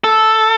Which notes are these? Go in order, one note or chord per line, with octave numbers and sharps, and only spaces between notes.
A4